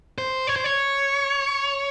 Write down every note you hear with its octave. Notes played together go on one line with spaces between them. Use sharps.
C5
C#5
C5
C#5